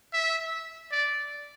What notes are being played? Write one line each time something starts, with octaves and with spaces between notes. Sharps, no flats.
E5
D5